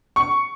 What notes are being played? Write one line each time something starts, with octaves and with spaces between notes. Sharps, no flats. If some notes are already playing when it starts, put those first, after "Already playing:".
C#6